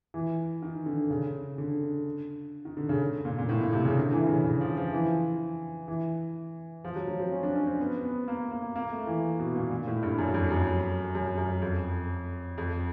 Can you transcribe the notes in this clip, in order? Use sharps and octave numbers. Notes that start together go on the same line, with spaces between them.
E3
D#3
D3
C#3
D3
D#3
D3
C#3
A#2
A#2
A2
A#2
C3
C#3
D3
E3
C#3
C#3
F3
F3
E3
E3
F3
F#3
F#3
C4
C#4
D4
C#4
C4
B3
B3
A#3
A#3
A#3
A3
E3
B2
A#2
A#2
A2
G2
F#2
F2
F#2
F#2
F#2
F2
F2